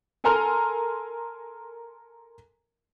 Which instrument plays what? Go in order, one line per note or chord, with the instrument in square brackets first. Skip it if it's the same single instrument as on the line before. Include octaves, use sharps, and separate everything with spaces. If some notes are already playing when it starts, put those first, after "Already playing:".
[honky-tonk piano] A4 A#4 G#5 A#5 C6 F6